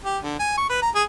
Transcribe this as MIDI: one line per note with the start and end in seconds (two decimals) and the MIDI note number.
0.04 0.18 67
0.23 0.37 50
0.39 0.54 80
0.57 0.67 85
0.69 0.77 71
0.82 0.90 82
0.95 1.03 68